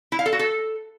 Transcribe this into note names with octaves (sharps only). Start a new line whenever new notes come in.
E4
F5
A4
F#4
A4